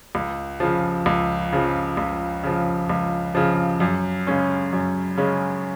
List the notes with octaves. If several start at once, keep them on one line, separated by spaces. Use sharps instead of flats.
C#2
C#3 F3
C#2
C#3 F3
C#2
C#3 F3
C#2
C#3 F3
F#2
C#3 G#3 C#4
F#2
C#3 G#3 C#4